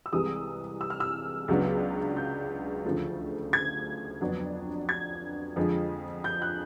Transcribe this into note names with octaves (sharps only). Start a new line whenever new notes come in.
E6
C2 C3 E3 G#3 D#6
E6
F6
E6
C#2 C#3 F#3 B3 D4
G6
D2 C#3 F3 A3
G#6
F2 D3 F#3 B3 D4
G#6
F2 D3 F3 G#3
G6
F#6